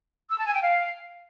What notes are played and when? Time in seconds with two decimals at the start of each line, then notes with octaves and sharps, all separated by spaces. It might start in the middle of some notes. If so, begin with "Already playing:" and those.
0.31 E6
0.39 A5
0.47 G#5
0.54 G5
0.62 F5